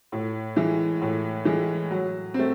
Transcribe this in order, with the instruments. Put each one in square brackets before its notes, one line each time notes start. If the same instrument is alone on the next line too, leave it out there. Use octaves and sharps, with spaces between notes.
[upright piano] A2
E3 G#3
A2
E3 G#3
F#3
C4
A3